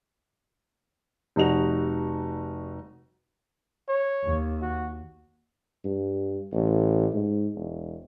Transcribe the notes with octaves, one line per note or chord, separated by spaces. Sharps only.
F1 G3 D#4 F#4 F7
C#5
D#2
F#4
G2
A1
G#2
E1